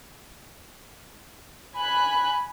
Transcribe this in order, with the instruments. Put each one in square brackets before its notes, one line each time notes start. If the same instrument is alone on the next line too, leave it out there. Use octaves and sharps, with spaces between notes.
[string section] G#5 B5 F#6